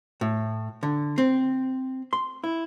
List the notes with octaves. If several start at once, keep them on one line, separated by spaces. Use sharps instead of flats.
A2
D3
C4
C6
E4